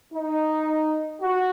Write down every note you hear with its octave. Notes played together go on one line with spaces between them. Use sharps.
D#4
F#4